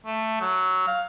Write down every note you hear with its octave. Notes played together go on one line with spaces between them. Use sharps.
A3
F#3
F5